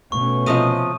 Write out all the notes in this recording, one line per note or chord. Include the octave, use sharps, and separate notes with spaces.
B2 A3 C#4 C#6
C3 F3 D#5 D#6 D#7